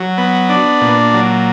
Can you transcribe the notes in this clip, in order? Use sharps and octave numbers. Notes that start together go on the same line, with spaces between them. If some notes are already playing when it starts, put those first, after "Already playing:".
Already playing: F#3
B3
D4
A#2
F#3